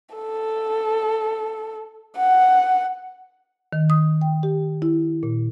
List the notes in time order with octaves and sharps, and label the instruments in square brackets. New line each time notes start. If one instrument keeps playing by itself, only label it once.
[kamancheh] A4
F#5
[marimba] D#3
D#6
G5
G4
E4
A#2